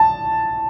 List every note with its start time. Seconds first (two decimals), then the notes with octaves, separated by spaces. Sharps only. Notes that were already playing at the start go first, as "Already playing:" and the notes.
Already playing: A5